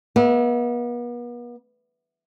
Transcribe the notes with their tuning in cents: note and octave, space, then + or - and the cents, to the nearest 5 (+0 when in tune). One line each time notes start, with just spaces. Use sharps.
B3 -40 E5 -20